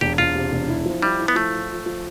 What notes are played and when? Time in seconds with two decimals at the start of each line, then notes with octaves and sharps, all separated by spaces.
0.01 E1 G4
0.18 E1 F4
0.35 C3
0.52 E1
0.68 E4
0.86 F3
1.02 G3 E4
1.19 E4
1.28 B3
1.35 F3 A3
1.53 F4
1.70 F4
1.86 F3